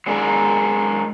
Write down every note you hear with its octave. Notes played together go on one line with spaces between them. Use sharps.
F#3 G#3 D4 A#4